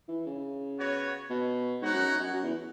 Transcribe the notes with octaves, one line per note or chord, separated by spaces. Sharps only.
E3
C#3
B3 F#4 C#5
B2
G#2 D#4 F#4 C#5 F#5
F#2
F#2
F#2
E2